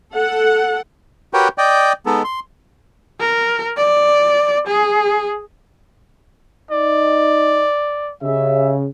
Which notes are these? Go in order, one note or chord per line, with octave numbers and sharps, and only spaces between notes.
A4 F#5
F#4 G4 A#4 B4 C#5 G5
D5 D#5 G5
G#3 B3 D#4 A4
C6
A#4
D5
G#4
D#4 D5 D#5
C#3 G4 D#5 E5